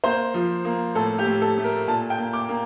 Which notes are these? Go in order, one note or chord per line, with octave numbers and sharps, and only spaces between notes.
A#3 C5
F3
A#3
A2 A4
G4
A2
A4
A3
A#4
A#2 A5
G5
A#3
D6
A#3